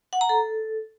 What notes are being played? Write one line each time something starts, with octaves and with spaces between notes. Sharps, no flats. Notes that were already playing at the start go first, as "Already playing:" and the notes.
F#5
A#5
A4